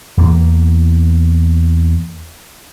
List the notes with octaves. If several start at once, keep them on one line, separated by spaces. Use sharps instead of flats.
E2 A#3